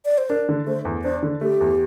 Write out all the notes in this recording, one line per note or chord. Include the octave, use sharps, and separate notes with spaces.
D5
C5
D4 A#4
D3
A3 C5
E2
D4 C5
D3
A3 G4
E2